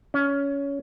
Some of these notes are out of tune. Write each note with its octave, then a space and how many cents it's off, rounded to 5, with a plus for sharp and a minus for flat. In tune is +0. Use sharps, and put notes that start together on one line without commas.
C#4 +15